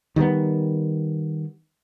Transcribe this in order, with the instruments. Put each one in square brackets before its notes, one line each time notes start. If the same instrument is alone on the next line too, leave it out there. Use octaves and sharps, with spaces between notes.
[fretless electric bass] D#3 G3 G#3 B3